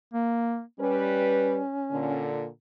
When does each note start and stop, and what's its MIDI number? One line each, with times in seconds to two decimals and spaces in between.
0.14 0.63 58
0.80 1.59 55
0.80 2.27 61
0.80 1.59 71
1.91 2.46 46
1.91 2.46 50